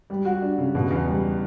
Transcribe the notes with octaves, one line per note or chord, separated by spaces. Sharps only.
G3
F#4
D4
C#3
B2
E2
G3